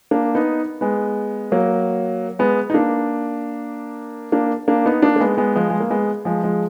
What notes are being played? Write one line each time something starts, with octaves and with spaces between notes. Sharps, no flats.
A#3 D4
B3 D#4
G#3 B3
F#3 A#3
G#3 B3
D#4
A#3 D4
A#3 D4
A#3 D4
B3 D#4
A#3 D4
A#3
G#3 B3
G#3 B3
F3 G#3
G#3
A#3
G#3 B3
F3 G#3
F3 G#3